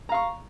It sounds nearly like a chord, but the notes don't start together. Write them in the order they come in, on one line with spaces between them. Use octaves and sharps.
A#5 F5 C#6